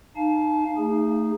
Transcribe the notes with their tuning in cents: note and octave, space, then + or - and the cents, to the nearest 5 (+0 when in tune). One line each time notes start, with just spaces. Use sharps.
D#4 -25 F5 +0 A5 -40
A3 +25 D#4 +0 G#4 -15